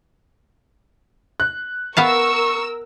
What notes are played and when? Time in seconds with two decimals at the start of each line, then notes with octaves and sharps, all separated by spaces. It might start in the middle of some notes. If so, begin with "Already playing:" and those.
1.40 F#6
1.97 B3 A#4 F5 A5 C#6 E6